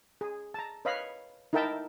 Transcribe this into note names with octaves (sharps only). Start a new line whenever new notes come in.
G#4
A5 A#5
B4 C#5 D#5 F5 B5
D#4 E4 A#4 E5 G5 A5